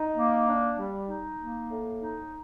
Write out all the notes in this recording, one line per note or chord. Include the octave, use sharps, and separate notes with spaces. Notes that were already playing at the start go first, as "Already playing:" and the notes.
Already playing: D#4
A#3
D4
G3
D#4
A#3
A2
D#4